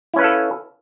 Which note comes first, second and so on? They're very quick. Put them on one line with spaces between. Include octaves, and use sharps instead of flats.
E4 C#4 B4 F5 A4